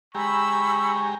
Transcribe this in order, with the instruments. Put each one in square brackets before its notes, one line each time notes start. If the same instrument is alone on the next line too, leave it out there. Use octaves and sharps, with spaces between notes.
[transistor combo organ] G#3 G4 A#5 [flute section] B5 E6 [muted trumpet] C#6